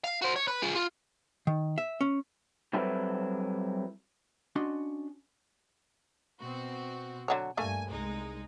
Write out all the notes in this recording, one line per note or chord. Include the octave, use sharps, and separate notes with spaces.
F5
F#4 C5
C#5
B4
F4 G#4
F4
D#3
E5
C#4
F#3 G3 C4 E4 A4 B4
C#4 D4 F#4 D#5 C6
B2 C4 F#4
D3 F#3 C#5
G2 A3 A#3 G#5
C2 G#3 D#4